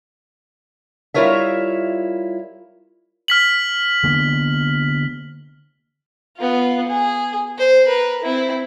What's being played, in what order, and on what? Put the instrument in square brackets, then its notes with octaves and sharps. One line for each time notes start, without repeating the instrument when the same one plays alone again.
[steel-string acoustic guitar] G3 E4 F4 A#4 C#5 E5
[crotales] F6 B6 F#7
[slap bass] D3 A#3 B3
[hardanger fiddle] B3 F4
G#4
C5
A#4 B4
C4 E4